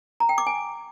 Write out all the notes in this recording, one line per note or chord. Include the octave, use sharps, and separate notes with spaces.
A#5
G5
D6
G#5